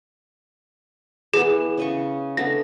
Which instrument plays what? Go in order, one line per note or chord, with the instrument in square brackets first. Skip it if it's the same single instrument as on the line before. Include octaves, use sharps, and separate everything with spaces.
[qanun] E3 B3 [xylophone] G#4
[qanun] C#3 D#5 C#6
[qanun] A3 B3 D4 [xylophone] A#6